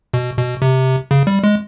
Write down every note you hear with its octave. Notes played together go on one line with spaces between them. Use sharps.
B2
B2
C3
C#3
G3
G#3